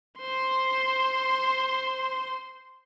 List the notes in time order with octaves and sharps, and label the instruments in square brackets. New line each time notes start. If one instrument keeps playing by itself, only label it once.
[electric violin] C5 C6